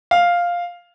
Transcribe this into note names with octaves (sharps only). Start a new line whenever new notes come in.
F5